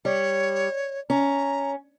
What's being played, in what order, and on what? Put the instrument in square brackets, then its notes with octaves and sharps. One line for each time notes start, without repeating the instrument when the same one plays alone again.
[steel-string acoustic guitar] G3 [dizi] C#5
[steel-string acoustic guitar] C#4 [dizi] A#5